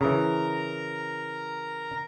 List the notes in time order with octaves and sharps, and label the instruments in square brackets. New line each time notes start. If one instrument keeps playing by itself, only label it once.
[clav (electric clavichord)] C#3 E3 [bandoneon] A#4 A#5